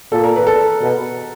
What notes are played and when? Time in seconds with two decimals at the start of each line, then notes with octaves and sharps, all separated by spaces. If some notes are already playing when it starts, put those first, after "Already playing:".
0.12 A#2 A4
0.24 A#4
0.36 B4
0.47 A4
0.82 B2